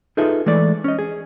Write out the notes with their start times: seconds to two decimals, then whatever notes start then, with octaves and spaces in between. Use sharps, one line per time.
0.17 D#4 F4 G#4 A4 B4 E5
0.46 E3 G#3 A3 D5
0.84 C#4 D#5
0.99 G#4